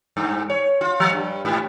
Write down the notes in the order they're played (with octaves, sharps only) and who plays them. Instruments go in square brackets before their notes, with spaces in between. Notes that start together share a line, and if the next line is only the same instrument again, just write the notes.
[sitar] G2
C#5
F4
F3
G2
G#2